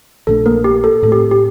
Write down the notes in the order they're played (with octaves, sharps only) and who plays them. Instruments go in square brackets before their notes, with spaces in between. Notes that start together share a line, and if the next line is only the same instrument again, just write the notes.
[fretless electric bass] A#1 A#2 A3 D4 [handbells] A4
[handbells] A#3 A#4
G4
A4
[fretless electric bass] A2 A3 C4 [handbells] A4
[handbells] G4
G4